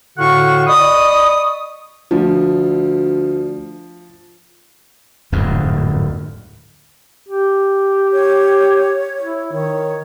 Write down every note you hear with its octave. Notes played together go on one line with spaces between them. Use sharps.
A2 D3 F#4 F5 F#5 C#6
D5 D#5 B5 C#6 D#6
D2 F3
D1 F2 G#2
G4
C#5
E4
D#3 C#5